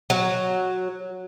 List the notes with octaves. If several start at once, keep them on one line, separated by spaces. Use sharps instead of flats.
F#3